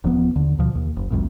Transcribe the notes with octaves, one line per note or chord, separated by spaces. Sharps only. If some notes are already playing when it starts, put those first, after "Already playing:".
D#1 F3 B3
D#2 D3
D2 B2 F3
D#2
F#1
G#1 C#2 F#2 A#2